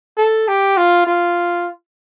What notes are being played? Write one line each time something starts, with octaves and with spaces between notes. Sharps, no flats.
A4
G4
F4
F4